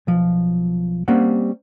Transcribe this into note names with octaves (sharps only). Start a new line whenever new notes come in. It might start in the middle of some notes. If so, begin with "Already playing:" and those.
B1 F3
G3 A#3 C4 C#4 F#5